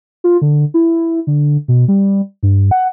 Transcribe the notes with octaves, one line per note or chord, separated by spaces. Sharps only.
F4
D3
E4
D3
B2
G3
G2
F#5